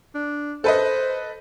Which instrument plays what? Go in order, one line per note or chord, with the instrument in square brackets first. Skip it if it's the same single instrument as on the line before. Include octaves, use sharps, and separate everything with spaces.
[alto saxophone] D4
[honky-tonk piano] A4 B4 D#5 [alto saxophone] C5